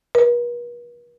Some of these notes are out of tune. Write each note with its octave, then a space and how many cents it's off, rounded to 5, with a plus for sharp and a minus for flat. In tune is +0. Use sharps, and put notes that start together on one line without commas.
B4 -45